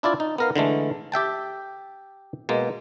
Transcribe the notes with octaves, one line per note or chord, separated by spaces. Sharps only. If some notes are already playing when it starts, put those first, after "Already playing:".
D4 E4 F4 D5
D#4
B3 A#4 F5
D3 E3 G#3 A3
G4 E5 G5 A5
B2 G#3 A#3